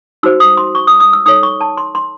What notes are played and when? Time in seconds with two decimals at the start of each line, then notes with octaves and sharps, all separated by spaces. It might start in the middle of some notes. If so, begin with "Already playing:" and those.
0.23 D#4 F#4 C5 E6
0.40 D#6
0.57 C6
0.75 C#6
0.87 D#6
1.00 D#6
1.13 E6
1.26 D#4 A4 C#5 D#6
1.43 C#6
1.61 A5
1.77 C6
1.95 C6